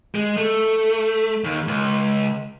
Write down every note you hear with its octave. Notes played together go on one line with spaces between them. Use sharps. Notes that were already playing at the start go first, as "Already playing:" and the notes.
G#3
A3
D#2
C#2